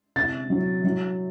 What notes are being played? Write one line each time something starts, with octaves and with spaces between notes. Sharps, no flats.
C3 A6
F#3
F#3